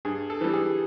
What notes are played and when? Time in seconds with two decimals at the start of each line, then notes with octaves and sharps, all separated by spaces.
0.05 G2 G#4
0.30 A4
0.41 E3 G3
0.53 G#4